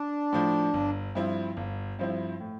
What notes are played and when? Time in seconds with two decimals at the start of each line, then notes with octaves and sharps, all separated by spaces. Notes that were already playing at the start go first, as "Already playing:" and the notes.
Already playing: D4
0.33 A2 F3
0.74 G1
1.15 G2 F3 C4 E4
1.57 G1
1.99 G2 F3 C4 E4
2.40 A2